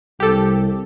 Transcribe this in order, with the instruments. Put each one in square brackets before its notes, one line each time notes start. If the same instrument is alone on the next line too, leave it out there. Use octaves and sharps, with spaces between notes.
[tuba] C2 [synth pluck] G4 A4